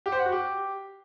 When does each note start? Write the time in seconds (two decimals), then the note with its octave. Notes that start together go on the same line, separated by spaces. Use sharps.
0.06 G4
0.12 C5
0.19 F#5
0.25 F#4
0.32 G4